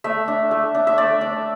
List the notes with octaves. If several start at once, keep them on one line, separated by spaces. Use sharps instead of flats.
A3 E5
D4
A3
D4
E5
A3 D5
D4